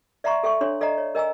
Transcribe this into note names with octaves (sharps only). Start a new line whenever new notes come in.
D5 E5 F#5 A#5 C6 C#6
A4 E5 G5 C#6
D4 A4 C#5 C6
A4 D5 D#5 F#5 A#5
C#5
A#4 D#5 G#5 A#5 E6